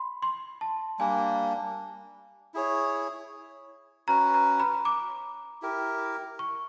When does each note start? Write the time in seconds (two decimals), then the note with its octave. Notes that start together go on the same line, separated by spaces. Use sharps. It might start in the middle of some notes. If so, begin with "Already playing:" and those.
Already playing: B5 C6
0.22 C6
0.61 A5
0.99 G3 A#3 D4 G#5
2.54 E4 G#4 C#5
4.08 C#4 F#4 B4 A#5
4.34 A#5
4.60 B5
4.85 D6
5.62 E4 G4 A#4
6.39 C#6